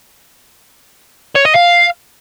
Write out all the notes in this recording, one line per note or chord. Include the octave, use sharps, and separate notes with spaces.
C#5
D#5
F5